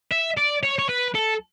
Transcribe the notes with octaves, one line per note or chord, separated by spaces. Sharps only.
E5
D5
C#5
C#5
B4
A4